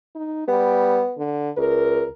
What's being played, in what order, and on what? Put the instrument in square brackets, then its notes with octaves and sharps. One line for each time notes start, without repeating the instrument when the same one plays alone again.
[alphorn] D#4
[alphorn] G3 [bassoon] B3
[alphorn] D3
[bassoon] C#2 [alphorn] A#4